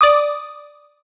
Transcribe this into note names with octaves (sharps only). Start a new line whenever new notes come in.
D5 D6 D#6